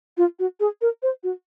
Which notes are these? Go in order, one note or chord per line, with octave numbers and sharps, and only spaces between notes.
F4
F#4
G#4
A#4
C5
F#4